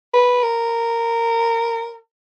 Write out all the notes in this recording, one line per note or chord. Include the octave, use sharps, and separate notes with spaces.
B4
A#4